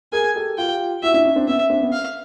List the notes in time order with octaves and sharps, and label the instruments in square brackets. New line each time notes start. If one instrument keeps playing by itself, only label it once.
[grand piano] G#4 A#4 [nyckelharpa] G#5
[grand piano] G4 A4
[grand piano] F4 G4 [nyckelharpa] G5
[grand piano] E4 F#4 [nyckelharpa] E5
[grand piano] D4 E4
C#4 D#4
C4 D4
[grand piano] B3 C#4 [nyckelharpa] E5
[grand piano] C4 D4
B3 C#4
[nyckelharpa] F5